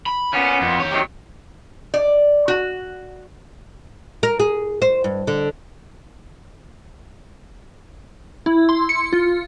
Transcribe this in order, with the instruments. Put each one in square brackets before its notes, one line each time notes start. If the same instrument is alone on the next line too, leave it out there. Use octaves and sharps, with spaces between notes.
[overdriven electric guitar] B5
[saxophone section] A#2 B3 [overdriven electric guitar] C#4
[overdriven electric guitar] F2
G4 C#5
[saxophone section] C3 D#3 F#3
[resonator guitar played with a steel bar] D5
F#4
[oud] A#4
G#4
C5
G2
D3
[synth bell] E4
C6
C#7
F4